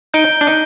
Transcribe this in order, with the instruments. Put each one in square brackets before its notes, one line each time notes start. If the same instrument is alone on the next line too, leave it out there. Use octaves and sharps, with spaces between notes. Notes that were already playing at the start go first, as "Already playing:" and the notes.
[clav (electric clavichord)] D#4 [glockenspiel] G6 D7 G7
[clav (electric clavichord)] D4
D#4